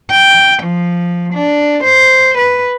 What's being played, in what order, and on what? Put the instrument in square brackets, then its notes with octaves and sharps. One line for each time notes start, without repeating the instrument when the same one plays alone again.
[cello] G5
F3
D4
C5
B4